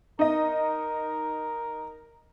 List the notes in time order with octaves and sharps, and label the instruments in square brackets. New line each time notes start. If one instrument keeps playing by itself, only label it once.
[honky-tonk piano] D#4 D#5 [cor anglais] A#4